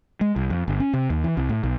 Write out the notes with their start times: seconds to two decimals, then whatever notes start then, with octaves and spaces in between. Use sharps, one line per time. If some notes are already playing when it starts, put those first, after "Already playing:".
0.21 G#3
0.36 C2
0.50 F2
0.68 G1
0.80 C#4
0.93 C3
1.10 D#2
1.24 E3
1.37 C2
1.49 A2
1.64 B1